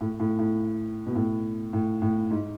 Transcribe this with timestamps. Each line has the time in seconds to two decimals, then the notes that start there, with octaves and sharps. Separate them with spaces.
0.01 A2
0.20 A2
0.39 A2
1.06 B2
1.15 A2
1.73 A2
2.02 A2
2.31 G#2